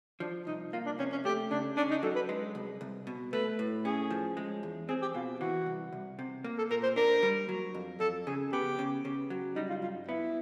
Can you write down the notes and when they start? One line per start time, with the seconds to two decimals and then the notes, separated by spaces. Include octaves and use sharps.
0.20 F3 D4
0.47 C2 D#4
0.73 A#3 F4
0.85 D4
0.99 C3 C#4
1.12 C#4
1.25 A3 G4
1.51 C#3 D4
1.77 C#4 D4
1.90 D#4
2.03 F#3 A4
2.15 B4
2.29 G#3
2.55 C2
2.81 C2
3.07 B2
3.33 A3 B4
3.59 A2
3.85 C#4 G#4
4.11 F3
4.37 G#3
4.63 E2
4.89 C4 G#4
5.02 G4
5.14 B2 F4
5.40 E3 F#4
5.66 C2
5.93 C2
6.19 C3
6.44 A#3
6.58 A4
6.70 A#2 A#4
6.83 C5
6.96 D4 A#4
7.23 G3
7.49 F#3
7.74 F2
8.00 F2 A4
8.27 C#3 G#4
8.52 B3 G4
8.79 C#3
9.05 C#3
9.30 F#3
9.56 G3 D#4
9.69 F4
9.82 G2 F4
10.08 B3 E4